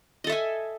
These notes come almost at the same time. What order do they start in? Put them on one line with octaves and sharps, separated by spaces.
D#5 A4 E5 G#5